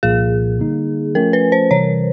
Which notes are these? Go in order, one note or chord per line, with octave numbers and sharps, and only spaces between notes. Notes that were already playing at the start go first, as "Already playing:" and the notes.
C2 A#2 F3 G#4
D3 G3 A#3 D#4
F3 A3 C#4 F4 A#4
B4
C5
C3 E3 G3 C#5